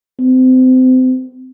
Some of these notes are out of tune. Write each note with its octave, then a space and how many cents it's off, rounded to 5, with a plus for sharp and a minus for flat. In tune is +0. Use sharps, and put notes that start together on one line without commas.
C4 -30